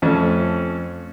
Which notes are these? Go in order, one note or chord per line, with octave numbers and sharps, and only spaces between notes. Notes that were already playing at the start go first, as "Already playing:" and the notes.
F2 A3 C#4